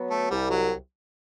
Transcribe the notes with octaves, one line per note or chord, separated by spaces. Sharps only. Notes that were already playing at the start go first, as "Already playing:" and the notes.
Already playing: F#3 B3
A3
C2 G3
F#3